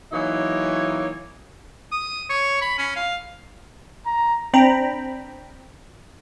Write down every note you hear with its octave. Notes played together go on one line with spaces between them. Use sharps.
E3 F#3 A#3 D#4 C#5 D#5
D#6
C#5
B5
C#4
F5
A#5
C4 D4 G5 A#5 B5